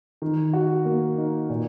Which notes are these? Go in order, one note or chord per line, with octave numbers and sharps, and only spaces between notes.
D#3
F#4
A#3
D#4
A#2